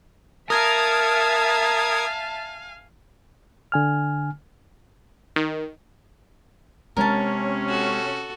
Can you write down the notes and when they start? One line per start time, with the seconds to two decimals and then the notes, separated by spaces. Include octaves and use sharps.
0.50 A#4 E5 F5 G#5 A5 D#6 G#6
3.72 D3 G#5 F6
5.36 D#3
6.97 C3 G#3 C#4 A#4 A5
7.68 F#4 A4